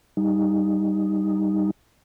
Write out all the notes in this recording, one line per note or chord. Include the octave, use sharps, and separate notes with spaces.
G3 D#4